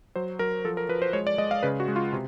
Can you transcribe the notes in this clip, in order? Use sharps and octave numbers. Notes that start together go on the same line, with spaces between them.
F#3 C5
F#3 A#4
F3 A4
A#4
F3 B4
C5
G#3 C#5
D5
G#3 D#5
F5
C#3 B4
F#4
G#3
F4
C3